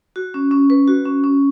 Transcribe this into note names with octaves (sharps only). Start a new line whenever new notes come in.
F#4
C#4
C#4
B4
F#4
C#4
C#4